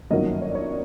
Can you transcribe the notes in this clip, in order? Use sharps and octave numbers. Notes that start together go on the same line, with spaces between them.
G1 F#2 D#3 F#3 A#3 D#5
C#5
D5
C#5